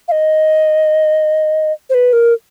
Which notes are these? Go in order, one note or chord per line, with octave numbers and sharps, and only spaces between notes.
F5
D#5
C5
B4
A#4